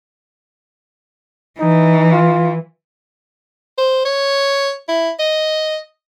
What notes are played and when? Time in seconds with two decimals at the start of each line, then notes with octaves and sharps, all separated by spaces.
1.60 E3 D#4
2.12 F4
3.78 C5
4.05 C#5
4.88 E4
5.19 D#5